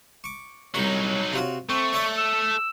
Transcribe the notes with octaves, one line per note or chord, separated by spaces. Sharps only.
C#6 D6
C2 F#3 D#4 C#5 B5 C#6
C3 F4 F#4
A3 C4 C#6
C#5 D5 E5
E6